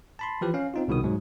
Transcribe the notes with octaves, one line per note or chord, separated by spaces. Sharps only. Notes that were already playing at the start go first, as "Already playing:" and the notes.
A5 B5 C6
E3 F3 G4 B4
C#4 F5
C4 D#4 F4
C2 B2 D#3 D#6
G#2 F#3